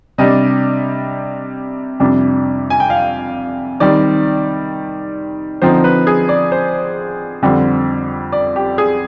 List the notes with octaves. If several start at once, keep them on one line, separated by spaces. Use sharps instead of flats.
C3 G3 D4 D#5
F2 C3 G3 D4
G#5
G5
F5
D#3 G3 C4 D5
D3 F3 C4 D#4 C5
B4
G#4
D5
C5
F2 D3 G3 C4
D5
G4
G#4